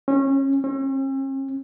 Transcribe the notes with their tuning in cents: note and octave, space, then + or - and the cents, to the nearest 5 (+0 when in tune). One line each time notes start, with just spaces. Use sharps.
C#4 -25
C#4 -45